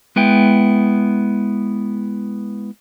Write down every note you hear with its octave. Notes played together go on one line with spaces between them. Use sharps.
G#3 B3 E4 G5